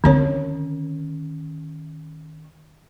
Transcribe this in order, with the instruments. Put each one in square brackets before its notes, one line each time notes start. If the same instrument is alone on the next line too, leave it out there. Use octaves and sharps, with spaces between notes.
[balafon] D3 C4 C#5 [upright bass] D#3 C#4